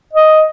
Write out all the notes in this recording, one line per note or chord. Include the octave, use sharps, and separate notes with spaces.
D#5